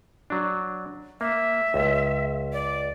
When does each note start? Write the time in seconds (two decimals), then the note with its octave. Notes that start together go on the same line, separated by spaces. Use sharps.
0.30 F#3 D4
1.21 A#3 E5
1.74 C#2
2.53 D5